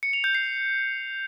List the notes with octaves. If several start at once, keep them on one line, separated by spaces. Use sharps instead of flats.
C#7
F7
G6
C7